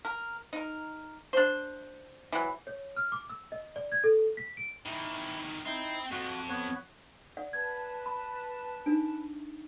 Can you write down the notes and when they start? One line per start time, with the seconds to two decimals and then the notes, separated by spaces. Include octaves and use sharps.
0.05 A#4
0.53 D#4 A#4
1.33 D4 C5
2.32 E3 F#3
2.67 C#5
2.97 F6
3.12 D6
3.30 E6
3.52 D#5
3.76 D5
3.92 G#6
4.04 A4
4.37 B6
4.57 D7
4.86 D#3 E3 E4
5.65 C4 D#4 E4
6.11 F2 F#4
6.49 B3 B4 C#5
7.37 D5 F#5
7.53 B4 A5 G#6
8.06 B5
8.86 D4 D#4 D7